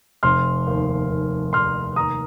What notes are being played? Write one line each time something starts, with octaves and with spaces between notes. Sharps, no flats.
F1 C6 F6
D#2
D#2
F1 C6 F6
D#2 A#5 D#6